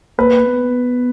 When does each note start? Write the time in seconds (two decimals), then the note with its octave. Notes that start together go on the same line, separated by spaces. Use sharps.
0.19 A#3 B4
0.47 B3